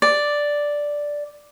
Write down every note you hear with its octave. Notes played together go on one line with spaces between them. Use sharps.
D5